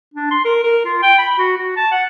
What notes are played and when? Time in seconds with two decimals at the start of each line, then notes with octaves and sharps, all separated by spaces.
0.14 D4
0.31 C6
0.45 A#4
0.63 A#4
0.85 F4
1.03 G5
1.18 B5
1.38 F#4
1.57 F#4
1.77 A5
1.92 F#5